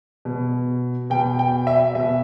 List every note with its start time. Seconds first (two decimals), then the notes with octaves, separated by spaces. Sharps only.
0.25 B2
1.10 B2 G5
1.39 G5
1.67 E5
1.95 B2 E5